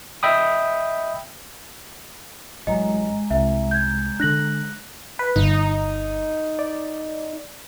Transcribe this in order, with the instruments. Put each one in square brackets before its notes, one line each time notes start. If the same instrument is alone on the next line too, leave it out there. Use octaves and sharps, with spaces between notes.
[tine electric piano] D#5 E5 G5 B5 D#6
[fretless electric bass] A1 F#3 [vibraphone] G#3 A#5 [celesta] D#5
[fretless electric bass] C2 [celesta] E5
[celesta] G6 G#6
[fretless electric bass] D3 D4 [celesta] F#6 A#6 F#7
[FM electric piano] B4
[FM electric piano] G1 [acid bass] D#4
[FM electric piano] D5